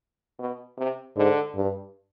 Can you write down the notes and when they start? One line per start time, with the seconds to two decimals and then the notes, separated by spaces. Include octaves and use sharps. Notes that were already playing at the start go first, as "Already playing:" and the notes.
0.39 B2
0.77 C3
1.16 G#2 D3
1.56 G2